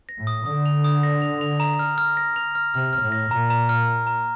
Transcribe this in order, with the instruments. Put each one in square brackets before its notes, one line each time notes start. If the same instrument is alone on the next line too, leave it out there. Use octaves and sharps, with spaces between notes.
[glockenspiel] A#6
[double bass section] A2
[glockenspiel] D#6
[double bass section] D3 [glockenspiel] D#6
[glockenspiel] F7
D#6
A#6
F7
F7
A#5
F6
F6
A#6
F7
F6
[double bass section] C3 [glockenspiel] F6
[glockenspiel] F6
[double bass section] A2
[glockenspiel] A#6
[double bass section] A#2 [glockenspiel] A#5
[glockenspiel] A#5
F6
F6
A#5